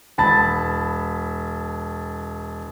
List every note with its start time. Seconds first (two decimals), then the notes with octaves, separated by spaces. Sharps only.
0.18 E1 A5 B5 A6